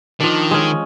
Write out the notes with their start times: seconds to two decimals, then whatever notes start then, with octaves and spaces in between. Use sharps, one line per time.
0.21 D#3 F3 D4
0.51 G#3 C#4